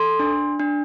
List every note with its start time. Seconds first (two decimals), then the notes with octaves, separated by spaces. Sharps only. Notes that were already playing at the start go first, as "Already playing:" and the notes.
Already playing: A4 C6
0.19 D4
0.59 D4